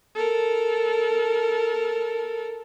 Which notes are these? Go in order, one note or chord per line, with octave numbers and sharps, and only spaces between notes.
A4 A#4